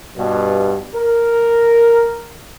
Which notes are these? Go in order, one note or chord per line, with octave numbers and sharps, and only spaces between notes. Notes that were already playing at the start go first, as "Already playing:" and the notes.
G2 B2
A#4